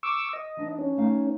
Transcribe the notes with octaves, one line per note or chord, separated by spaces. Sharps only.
C#6 D6 E6
D#5
E3 D4 D#4
C#4
A3 D#4 F5